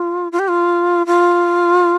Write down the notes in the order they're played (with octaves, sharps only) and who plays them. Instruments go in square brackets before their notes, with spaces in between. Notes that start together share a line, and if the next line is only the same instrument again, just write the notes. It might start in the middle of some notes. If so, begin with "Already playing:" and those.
Already playing: [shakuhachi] F4
F4
G4
F4
F4